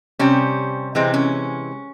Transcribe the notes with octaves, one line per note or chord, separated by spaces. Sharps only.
C3 G3 C#4
C3 E3 G#3 C4
C#4